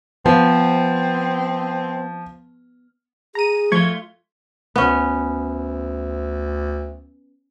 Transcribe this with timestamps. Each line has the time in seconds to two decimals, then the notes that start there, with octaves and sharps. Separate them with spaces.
0.26 F3 B3 C4
3.35 G#4 A#5 D#7
3.72 F3 A3 F4 C#6 G#6
4.76 D2 B3 C#4